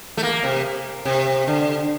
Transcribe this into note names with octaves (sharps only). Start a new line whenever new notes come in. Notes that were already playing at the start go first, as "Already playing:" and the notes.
A3
A#3
C3
C3
D3